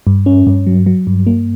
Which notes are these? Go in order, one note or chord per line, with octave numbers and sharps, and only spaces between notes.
G2
C#4
G2
F#3
F#3
G2
A#3